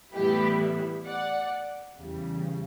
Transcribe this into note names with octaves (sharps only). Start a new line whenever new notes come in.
A2 E3 G3 B3 E4 G4
D5 F#5
E2 C#3 E3 G3